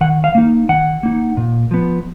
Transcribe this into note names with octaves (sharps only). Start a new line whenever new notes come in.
D#3 F#5
F5
A#3 D#4
D#3 F#5
A#3 D#4
A#2
F3 B3